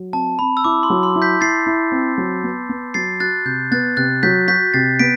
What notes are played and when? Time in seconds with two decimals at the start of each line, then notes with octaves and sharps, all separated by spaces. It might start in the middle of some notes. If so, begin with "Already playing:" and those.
Already playing: F#3
0.13 C4 A5
0.39 C4 B5
0.57 E6
0.64 E4 D6
0.83 C6
0.90 F#3
1.03 C6
1.16 E4
1.22 G6 B6
1.41 E4 A6 C7
1.67 E4
1.92 C4
2.18 F#3
2.44 B3
2.69 B3
2.94 F#3 A6 C7
3.20 F#4 F#6 A6
3.45 C3 G6
3.71 B3 F#6 A6
3.97 C3 F#6 A6
4.23 F#3 G6 B6
4.48 F#4 G6 B6
4.73 C3 A6 C7
4.99 B3 B6 D7